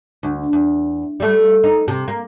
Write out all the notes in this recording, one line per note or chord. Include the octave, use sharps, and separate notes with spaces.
D2
E2
G3 A3
D#4
C3
A#3